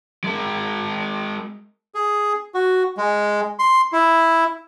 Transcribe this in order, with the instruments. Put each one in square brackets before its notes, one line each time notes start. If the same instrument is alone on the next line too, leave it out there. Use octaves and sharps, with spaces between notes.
[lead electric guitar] G#3 A#4
[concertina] G#4
F#4
G#3
C6
E4